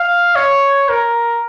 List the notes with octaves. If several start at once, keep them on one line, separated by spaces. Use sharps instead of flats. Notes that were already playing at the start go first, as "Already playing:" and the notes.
Already playing: F5
C#5
A#4